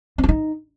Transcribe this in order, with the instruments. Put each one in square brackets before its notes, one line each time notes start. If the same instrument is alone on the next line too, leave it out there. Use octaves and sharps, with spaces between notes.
[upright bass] C4
F4
D#4